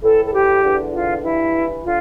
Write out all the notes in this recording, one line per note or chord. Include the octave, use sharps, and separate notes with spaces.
A2 E3 A4
A4
G4
E2 D3
F4
G2 E3 E4
D3 F4